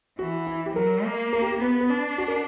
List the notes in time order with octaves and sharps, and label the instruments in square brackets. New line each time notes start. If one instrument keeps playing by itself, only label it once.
[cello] E3 [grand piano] F#4
[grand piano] E4
G4
[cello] F#3 [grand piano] A#4
[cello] A#3
[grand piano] A#4
G4
G4
[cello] B3 [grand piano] B4
[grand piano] B4
[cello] D4
[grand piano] F#4
A#4